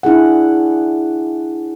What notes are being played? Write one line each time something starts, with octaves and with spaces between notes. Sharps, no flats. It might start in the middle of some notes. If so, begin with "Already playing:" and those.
D4 E4 G#4 F#5